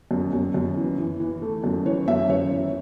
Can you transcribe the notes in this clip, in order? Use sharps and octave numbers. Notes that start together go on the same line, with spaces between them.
F#2
F#2
F#2
E3
E3
E3
A3
F#2
E3 C#5
F#2 E5
F#2 C#5
E3